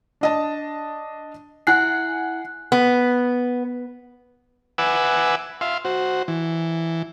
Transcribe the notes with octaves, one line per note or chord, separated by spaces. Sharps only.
D4 D#5 A5
E4 F#5 G#5 F#6 C7
B3
B4 E5 F#5 G#5 D6 E6
E5 F5 C6
F#4 C5
E3